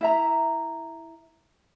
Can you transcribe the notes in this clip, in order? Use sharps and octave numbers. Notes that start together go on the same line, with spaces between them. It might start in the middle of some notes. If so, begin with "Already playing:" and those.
E4 E5 A#5